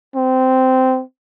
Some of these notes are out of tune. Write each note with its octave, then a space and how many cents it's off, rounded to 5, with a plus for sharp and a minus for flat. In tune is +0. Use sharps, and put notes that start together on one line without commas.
C4 -15